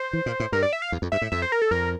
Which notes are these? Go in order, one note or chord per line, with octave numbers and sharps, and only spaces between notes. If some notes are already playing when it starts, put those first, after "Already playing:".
Already playing: C5
E3
A#2
A2
G2 A#4
D5
E5
F5
E2
F2
G2 E5
A2
F2 E5
C5
A#4
A4
F2 A#4